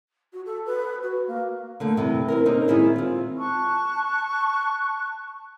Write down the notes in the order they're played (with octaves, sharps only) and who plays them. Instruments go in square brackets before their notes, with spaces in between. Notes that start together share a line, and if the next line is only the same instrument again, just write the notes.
[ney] F#4
A4
B4
F#4
A#3
[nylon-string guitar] D3 A3 A#3
G2 C3 E3
C4 E4 A#4
A#3 C4 C#4 D#4
D#3 G#3 E4 G#4
C4 F4
[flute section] A5 C#6 F#6